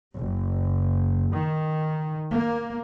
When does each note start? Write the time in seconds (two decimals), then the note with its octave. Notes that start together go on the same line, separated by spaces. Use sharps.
0.15 F#1
1.30 D#3
2.32 A#3